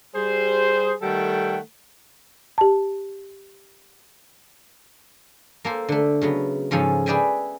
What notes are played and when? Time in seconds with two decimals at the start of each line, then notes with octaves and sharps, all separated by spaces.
0.15 G3 G#4 C5
1.01 D#3 G3 A3 A4 F#5 G5
2.58 G4 A5
5.65 A#3 A4 C5
5.89 D3 A3
6.22 C#3 F#3 B3
6.71 G#2 C#3 F3 A4 G#5
7.06 G#4 B4 D5 E5 G5 G#5